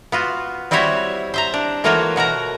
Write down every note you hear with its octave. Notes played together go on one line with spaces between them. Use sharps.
B3 F4 F#4
G3 C4 E4 F#4 C#5 E5
C5 E5 A#5
D4
E3 A3 A#3 F4 F#4 C#5
B2 F#4 A#4 A#5